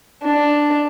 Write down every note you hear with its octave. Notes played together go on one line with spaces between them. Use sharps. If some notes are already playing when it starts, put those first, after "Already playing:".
D4